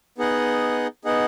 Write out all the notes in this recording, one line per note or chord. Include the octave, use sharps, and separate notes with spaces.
B3 D#4 G#4 D#5 F#5
B3 D#4 G#4 D#5 F#5